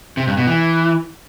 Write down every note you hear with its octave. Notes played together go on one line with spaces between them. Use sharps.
C3
G2
B2
E3